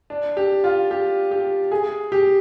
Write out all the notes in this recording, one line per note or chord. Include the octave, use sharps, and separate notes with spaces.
D4
G4
F4
G4
G4
G#4
G4